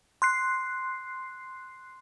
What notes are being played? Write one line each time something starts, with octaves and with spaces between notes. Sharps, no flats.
C6 F#6 C7